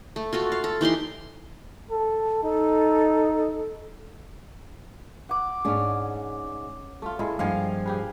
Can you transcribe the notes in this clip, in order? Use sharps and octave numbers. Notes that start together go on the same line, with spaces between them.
A3
F4 F#4 A4
F5
A4
E3 D#4 G4 C6
A4
D#4 A4
F#5 D6
G#2 C#4 D4 G#4
A3 F4
A#2 G#3 E4 A4
G2 F3 G#3 F5 G#5
G4 G#4 B4